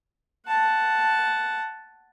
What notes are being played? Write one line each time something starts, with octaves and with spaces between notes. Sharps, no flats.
F#5 A5